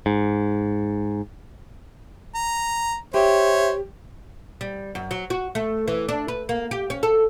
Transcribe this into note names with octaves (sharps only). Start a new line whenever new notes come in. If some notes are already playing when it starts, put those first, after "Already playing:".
G#2
A#5
G4 C5 C#5 E5
G3
F#2
F#3
F#4
A3
E3
D4
B4
A#3
G4
C#4
A4